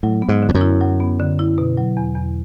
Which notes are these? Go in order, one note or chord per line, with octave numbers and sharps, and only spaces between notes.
A2 F#3
B3
G#2
D3
F2
F#2
E4
F#3
B3
D3
E4
B2
F#3
E2
E2